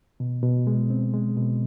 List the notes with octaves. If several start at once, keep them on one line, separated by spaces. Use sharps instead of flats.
B2
B2
G#3
C4
G#3
B2